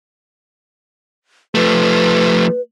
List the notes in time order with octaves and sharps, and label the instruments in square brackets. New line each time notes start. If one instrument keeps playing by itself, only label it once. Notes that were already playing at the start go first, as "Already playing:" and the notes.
[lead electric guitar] F3 A3 [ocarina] B4